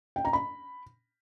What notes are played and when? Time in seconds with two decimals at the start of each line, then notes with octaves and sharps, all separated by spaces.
0.16 G5
0.25 A#5
0.33 B5